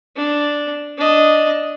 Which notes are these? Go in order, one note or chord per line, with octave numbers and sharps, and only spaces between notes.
D4
D4 D#5